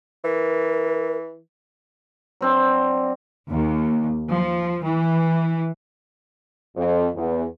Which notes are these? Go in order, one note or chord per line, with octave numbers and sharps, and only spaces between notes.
E3 A#4
F#3 C4 D4
D#2
F3
E3
F2
E2